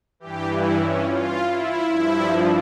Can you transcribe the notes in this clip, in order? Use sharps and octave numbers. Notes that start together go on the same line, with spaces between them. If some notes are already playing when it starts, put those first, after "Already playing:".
G2 E3 G4
E4
C#4
F4
E4
G2 F3 E4